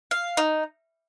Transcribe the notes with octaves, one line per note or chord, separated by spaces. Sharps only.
F5
D#4